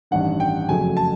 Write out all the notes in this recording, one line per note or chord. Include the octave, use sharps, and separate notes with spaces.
A1 G2 D#3 F#5
G5
F#1 F2 C#3 F#3 A3 G#5
A5